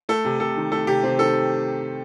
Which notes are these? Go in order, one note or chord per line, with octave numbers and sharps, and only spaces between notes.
A3 A4
C3
C3 A4
D#3
A3 A4
C3 G4
C3 C4
D#3 A4